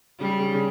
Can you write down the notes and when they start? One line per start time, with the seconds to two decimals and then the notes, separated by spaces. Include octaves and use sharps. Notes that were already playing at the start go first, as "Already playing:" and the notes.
0.20 C#3 G3
0.40 C#3
0.54 C#3